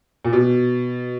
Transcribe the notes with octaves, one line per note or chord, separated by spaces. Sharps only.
A#2
B2